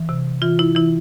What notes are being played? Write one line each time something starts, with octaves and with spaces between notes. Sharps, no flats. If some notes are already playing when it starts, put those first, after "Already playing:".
Already playing: E3
C3
E3 F4
E4
E3 E4